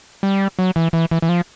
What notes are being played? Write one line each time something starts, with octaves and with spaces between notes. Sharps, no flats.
G3
F#3
E3
E3
E3
E3
F3